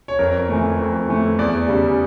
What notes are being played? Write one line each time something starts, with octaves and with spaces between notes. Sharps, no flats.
C#5
F2 A#4
E3 A3
F2
E3 A3
E2 D5
C#3 G3